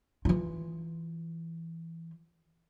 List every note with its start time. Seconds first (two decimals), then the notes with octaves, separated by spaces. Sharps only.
0.25 E3 F4